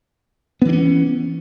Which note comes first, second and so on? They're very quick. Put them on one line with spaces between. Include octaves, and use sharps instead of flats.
B3 E3 D4 C#4